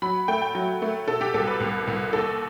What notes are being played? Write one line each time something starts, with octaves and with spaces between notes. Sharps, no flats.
F#3 B5
A3 G5
G5
F#3
A3
B2 A4
G4
C2 A4
B4
C2
C2
D#2 A4